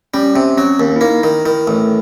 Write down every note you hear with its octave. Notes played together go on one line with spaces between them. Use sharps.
G3 C#4
C3 C4
F#3 C#4
D#2
E4
A#3 D#4
D#3
D#3 E4
A1